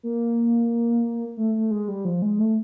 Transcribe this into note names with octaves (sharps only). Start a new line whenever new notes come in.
A#3
A3
A3
G#3
G3
F3
G#3
A3